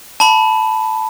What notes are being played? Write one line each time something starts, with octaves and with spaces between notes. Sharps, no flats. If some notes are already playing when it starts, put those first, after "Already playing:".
A5 B5